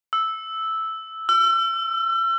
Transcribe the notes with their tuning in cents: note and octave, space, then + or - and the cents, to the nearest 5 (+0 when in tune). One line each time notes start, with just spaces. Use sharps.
E6 -5
E6 +40